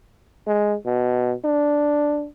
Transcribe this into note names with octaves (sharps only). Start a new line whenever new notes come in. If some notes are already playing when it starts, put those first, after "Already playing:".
G#3
B2
D4